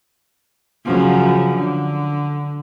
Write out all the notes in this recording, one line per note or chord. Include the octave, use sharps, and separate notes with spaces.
F#2 C#3 F3
D3